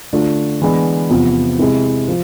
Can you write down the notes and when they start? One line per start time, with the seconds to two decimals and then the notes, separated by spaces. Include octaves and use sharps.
0.13 D3 A3 D4 F4
0.62 E3 G#3 B3 D4
1.10 E2 C3 F3 B3 F4
1.59 C3 G#3 C4 E4
2.08 F3